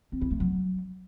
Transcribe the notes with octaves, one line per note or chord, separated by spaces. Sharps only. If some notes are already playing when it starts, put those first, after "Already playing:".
C4
E4
A3
F#3